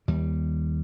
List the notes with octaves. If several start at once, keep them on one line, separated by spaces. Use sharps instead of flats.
D#2 G3